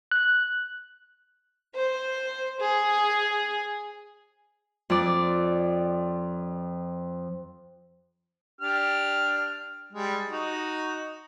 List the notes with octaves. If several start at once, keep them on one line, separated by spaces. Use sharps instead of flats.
F#6
C5
G#4
F2 D5
D4 G4 F6
G3 G#3
D#4 F#4